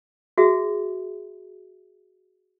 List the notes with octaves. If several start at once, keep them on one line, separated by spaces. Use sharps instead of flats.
F#4 G#4 E5